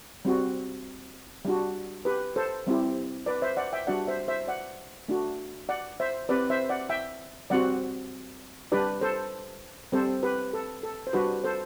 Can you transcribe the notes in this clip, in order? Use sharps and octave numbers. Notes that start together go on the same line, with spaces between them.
G3 C4 F#4
G3 D4 F#4
G4 B4
A4 C5
G3 C4 E4 G4
B4 D5
C5 E5
D5 F#5
E5 G5
G3 D4 F#4 D5 F#5
C5 E5
C5 E5
D5 F#5
A3 D4 F#4
D5 F#5
C5 E5
C4 G4 B4 D5
C5 E5
D5 F#5
E5 G5
G3 C4 F#4 D5 F#5
G3 D4 G4 B4 D5
A4 C5
G3 C4 G4 A4 C5
G4 B4
A4
A4
C5
G3 D4 F#4 G4 B4
A4 C5